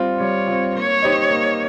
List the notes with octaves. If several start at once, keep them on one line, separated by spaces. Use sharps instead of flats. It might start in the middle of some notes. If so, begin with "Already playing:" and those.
Already playing: G3 C4 F4
G3 C#5
C4 F4
A#3 C#5
D#4 G4 C5 D#5
A#3